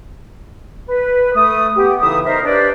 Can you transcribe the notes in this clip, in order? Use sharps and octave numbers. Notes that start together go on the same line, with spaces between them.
B4
A3 D#6
B3 G4
A2 C#3 E3 D#4 E5 D#6
D#4 A#4 C5 E5
D4 G4 B4 C5 D5